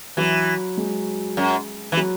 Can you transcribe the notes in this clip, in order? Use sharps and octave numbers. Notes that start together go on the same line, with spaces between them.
E3 F#3
G#3
F#2
E3
F#3